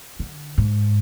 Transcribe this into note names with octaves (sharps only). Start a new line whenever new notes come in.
D3
G#2